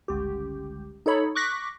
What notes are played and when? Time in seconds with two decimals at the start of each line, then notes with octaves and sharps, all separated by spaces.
0.08 G1 C#2 G4
1.06 D#4 A4 C#5 B5
1.35 C#6 D6 F#6 A#6 B6